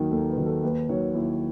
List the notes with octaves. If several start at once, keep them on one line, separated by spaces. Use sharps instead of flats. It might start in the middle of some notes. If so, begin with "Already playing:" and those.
Already playing: D#2 D#3 F#3
D#2 A4
B4
D#3 F#3
A4
D#2 B4
D#3 F#3 C#5
D#2 E4